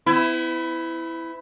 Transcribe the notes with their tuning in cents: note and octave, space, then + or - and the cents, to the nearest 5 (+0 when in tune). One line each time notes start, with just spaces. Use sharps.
B3 +45 E4 +0